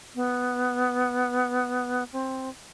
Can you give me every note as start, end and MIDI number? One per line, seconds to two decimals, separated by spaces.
0.15 2.04 59
2.13 2.49 60